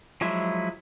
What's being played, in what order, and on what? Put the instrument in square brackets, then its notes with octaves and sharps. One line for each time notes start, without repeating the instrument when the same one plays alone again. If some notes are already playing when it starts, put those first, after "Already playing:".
[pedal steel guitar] F3 F#3 G#3 E4